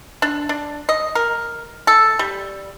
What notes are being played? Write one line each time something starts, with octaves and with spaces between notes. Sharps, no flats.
D4
D4
D#5
A#4
A4
G3